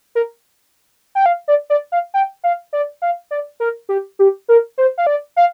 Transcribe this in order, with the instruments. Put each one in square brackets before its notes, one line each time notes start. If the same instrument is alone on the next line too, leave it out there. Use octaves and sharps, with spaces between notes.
[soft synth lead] A#4
G5
F5
D5
D5
F5
G5
F5
D5
F5
D5
A#4
G4
G4
A#4
C5
F5
D5
F5